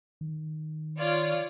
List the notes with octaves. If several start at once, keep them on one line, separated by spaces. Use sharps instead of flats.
D#3
F4 C#5 D5